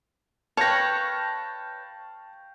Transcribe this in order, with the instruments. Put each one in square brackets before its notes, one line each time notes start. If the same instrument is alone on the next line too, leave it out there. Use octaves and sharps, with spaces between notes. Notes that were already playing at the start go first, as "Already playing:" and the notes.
[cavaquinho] B4 C#5 [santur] F5 G5 C#6 [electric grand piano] A5 A#6